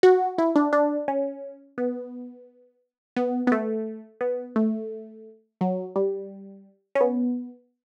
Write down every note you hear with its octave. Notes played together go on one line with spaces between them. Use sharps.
F#4
E4
D4
D4
C#4
B3
B3
B3
A3
B3
A3
F#3
G3
C#4
B3